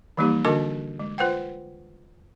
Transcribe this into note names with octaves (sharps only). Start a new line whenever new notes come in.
E3 F3 G3 A#3 D#4 G4
D3 D4 F#4 A#4 D#5 D6
G#3
F4 B4 C5 F#5 G5